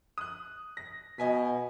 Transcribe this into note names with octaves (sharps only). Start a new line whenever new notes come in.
D#6 F#6
A#6
B2 D#5 G#5 B6